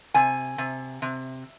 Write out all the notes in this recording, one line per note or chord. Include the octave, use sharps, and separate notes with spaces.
C3 G#5
C3
C3